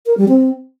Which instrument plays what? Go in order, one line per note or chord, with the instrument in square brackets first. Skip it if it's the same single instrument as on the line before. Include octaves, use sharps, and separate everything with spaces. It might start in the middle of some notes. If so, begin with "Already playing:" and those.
[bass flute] A#4
G3
C4